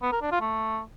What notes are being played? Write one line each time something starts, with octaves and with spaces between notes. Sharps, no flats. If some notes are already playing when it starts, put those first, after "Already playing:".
B3
A#4
D4
F4
A3